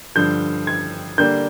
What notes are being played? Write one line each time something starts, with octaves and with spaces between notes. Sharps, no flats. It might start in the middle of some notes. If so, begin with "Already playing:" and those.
G2 D3 F3 G6
G#6
D3 G3 A#3 D4 G6